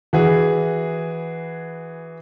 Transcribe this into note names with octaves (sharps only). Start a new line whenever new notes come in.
E3 F#4 G#4